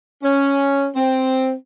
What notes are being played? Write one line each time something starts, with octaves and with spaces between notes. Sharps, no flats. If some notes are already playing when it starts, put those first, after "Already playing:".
C#4
C4